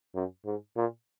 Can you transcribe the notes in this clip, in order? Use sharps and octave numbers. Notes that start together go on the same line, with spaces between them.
F#2
G#2
A#2